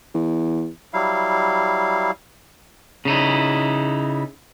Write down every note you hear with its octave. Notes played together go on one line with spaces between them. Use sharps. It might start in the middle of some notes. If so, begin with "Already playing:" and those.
E2
F#3 G3 E4 F5
C#3 D#4 E4